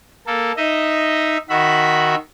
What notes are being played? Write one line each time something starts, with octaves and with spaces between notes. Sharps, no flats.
A#3 A4
D#4 D#5 E5
D#3 F#4 E5 B5